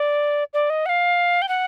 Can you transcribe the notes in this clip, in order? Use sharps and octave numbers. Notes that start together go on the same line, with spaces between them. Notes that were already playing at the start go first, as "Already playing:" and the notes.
Already playing: D5
D5
D#5
F#5
F5
G5
F#5